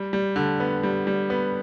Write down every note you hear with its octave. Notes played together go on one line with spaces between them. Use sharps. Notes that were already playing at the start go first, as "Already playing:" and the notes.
Already playing: G3
G3
D3
B3
G3
G3
B3